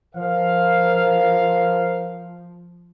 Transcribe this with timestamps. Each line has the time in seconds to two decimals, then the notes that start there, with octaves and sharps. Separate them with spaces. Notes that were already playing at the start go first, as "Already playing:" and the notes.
0.15 F3 A#4 C5 F5